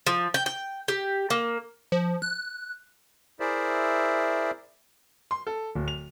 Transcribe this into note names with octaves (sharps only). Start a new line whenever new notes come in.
F3
G5
G5
G4
A#3
F3
F#6
E4 G#4 A#4 C5 D5 E5
C6
A4
D1
F7